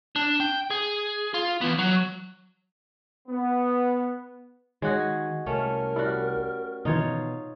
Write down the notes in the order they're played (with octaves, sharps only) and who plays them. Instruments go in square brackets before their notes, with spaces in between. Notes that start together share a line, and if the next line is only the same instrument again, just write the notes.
[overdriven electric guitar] D4
G5
G#4
F4
E3 B3
F#3
[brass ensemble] B3
[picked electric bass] D#3 [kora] G#3 F#4 G#4 [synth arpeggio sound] C#5
[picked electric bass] C2 [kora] A3 C#4 [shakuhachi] A#4
[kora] G3 F#4 [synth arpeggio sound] E4
[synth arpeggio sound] G#2 D#3 E3 [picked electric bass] B2 [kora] D#4 F4 C#5